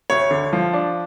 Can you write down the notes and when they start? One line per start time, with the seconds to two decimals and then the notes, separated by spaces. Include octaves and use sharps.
0.10 D2 C#5
0.31 D3
0.53 F3
0.73 D4